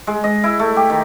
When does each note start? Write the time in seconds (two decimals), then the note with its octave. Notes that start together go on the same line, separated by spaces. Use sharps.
0.07 G#3
0.24 D#5
0.44 E4
0.59 A3
0.76 G4
0.90 D#3